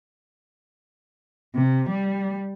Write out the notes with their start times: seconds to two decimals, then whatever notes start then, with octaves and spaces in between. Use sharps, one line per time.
1.55 C3
1.89 G3